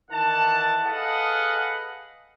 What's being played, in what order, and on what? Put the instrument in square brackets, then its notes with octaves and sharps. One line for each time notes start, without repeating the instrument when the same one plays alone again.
[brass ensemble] D#3 E3 F#5 A5
G#4 A4 B4 D#5 F5 F#5